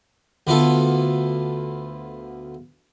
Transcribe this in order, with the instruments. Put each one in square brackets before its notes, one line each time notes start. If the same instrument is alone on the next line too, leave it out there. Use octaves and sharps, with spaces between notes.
[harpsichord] D2 B3 F4 A4